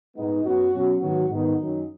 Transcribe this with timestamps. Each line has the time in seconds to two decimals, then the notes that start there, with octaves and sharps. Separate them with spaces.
0.17 G#2 G#3 B3 D#4
0.44 F#2 F#3 B3 F#4
0.73 B2 F#3 C#4
1.01 G#2 D#3 F#3 B3 F#4
1.29 G#2 D#3 B3 D#4
1.58 F#2 D#3 F#3 C#4